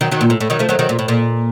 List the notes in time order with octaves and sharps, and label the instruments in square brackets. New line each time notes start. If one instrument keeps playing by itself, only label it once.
[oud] D#3 F#3
D#3 F#3
A#2
A2
A2
D#3 F#3
F3 A3
D#3 F#3
D#3 F#3
A#2
A2
A#2